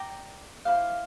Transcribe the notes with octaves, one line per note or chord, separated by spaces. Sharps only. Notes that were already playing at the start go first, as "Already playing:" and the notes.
Already playing: D5 G5 A#5 D6
E4 G4 C5 F5